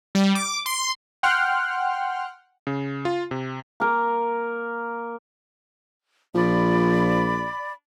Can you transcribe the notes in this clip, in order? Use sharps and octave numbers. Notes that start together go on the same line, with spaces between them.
G3
D6
C6
F#5 G5 C6 F6 F#6
C#3
F4
C3
A#3 A#4
A#1 F3 D5 B5